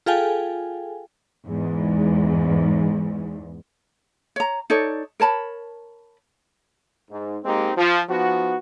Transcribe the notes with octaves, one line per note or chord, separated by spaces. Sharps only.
F4 G#4 A4 F5 G5 G#5
E2 G#2
C#5 A#5
D#4 A4 C#5 D5
A#4 C#5 A5 B5
G#2
G#3 A#3 C4 D#4 G4
F3
F3 B3 D#4 F#4